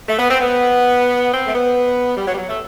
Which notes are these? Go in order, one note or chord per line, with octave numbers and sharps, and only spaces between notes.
A3
B3
C4
B3
C4
A3
B3
G3
F#3
G3
F#3
A3